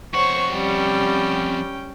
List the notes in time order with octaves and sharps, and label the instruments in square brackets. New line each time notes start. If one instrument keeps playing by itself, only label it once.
[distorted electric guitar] F2 F#5 [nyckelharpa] C5 C#5 [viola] C#6
[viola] G3 [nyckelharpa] C#4 G5